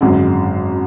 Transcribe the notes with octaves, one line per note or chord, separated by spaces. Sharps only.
G#1 F#2 D3 G#3